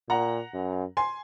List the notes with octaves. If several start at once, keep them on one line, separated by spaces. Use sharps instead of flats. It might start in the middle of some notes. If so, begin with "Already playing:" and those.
A#2 F#5 A#5
F#2
G#5 C6